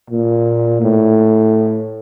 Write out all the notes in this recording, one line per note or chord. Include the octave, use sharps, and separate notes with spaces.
A#2
A2